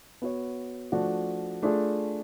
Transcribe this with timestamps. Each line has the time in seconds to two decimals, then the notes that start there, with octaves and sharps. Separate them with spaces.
0.22 B3 F#4 C#5
0.92 F3 A3 D4 F#4
1.63 A3 D4 F4 G#4